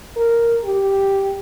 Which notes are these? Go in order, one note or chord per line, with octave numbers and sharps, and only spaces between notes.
A#4
G4